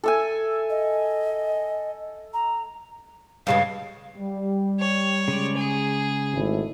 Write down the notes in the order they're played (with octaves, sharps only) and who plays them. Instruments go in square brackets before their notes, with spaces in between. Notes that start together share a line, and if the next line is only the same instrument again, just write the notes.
[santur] A4 E5 G#5
[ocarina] D#5
A#5
[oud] G2 C#3 G#3 [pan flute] F5
[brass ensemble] G3
[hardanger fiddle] C#5
[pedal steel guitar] C#3 G#3 D5
[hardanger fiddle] G#4
[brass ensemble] G#1 A3 E4